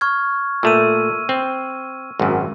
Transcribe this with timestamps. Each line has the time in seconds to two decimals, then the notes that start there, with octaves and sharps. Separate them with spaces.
0.01 C#6 F6 G#6
0.63 A#2 A3 E6 D#7
1.29 C4
2.20 G#1 F#2